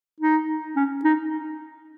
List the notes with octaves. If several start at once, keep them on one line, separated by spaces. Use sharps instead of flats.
D#4
C#4
D#4